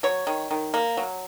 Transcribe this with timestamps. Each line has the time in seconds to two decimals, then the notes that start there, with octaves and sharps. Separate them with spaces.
0.03 F#3 C#5
0.27 D#3
0.51 D#3
0.74 A#3
0.97 F#3